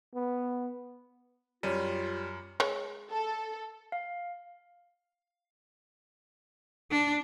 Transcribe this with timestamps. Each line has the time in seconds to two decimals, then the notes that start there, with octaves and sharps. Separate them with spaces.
0.15 B3
1.63 F#2 G3 F4 C#5 D#7
2.60 G#3 C#5
3.10 A4
3.92 F5
6.91 D4